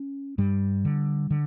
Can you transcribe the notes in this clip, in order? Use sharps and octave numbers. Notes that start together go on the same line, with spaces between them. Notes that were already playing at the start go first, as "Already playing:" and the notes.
Already playing: C#4
G2 G3
D3
D3